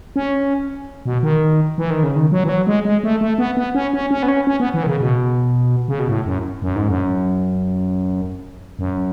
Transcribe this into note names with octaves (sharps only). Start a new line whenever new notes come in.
C#4
B2
D#3
E3
D#3
C#3
D#3
F#3
E3
F#3
G#3
G#3
A3
A3
B3
B3
C#4
C#4
C#4
B3
C#4
C#4
B3
E3
D#3
C#3
B2
C#3
B2
A2
F#2
F#2
G#2
F#2
F#2